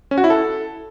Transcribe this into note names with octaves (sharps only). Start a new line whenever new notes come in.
C#4
F#4
E4
A4